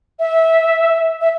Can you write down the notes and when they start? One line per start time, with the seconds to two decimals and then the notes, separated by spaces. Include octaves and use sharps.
0.19 E5
1.21 E5